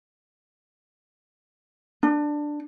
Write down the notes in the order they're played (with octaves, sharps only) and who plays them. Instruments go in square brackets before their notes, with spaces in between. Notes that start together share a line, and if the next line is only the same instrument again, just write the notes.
[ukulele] D4